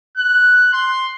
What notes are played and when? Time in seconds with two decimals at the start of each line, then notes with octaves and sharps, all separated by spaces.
0.18 F#6
0.73 C6